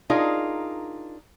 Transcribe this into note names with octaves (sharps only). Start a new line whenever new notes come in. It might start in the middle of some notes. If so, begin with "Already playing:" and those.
D4 D#4 F4 G#4 A#4